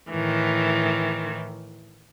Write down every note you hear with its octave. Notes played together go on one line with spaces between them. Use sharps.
A2 D#3 E3